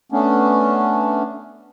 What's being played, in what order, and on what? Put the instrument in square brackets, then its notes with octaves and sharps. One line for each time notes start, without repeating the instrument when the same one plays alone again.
[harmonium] A3 B3 C#4 D4